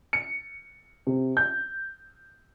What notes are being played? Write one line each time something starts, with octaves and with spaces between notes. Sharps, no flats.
C#7
C3
G6